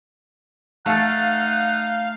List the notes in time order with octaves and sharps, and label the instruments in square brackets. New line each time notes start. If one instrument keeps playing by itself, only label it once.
[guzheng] A3 A4 [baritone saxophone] D#4 [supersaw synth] F5 [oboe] F#5